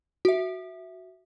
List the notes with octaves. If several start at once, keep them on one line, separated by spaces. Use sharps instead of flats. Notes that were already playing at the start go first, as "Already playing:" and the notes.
F#4 E5